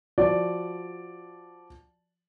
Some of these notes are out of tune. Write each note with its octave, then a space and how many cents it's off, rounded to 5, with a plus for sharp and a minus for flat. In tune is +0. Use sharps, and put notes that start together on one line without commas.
F3 +0 F#4 +0 D5 +0